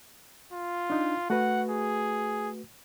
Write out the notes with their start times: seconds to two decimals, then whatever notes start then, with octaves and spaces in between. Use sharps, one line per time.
0.53 F4
0.90 D4 D#4
1.30 A3 F#4 B4 F#5
1.70 G#4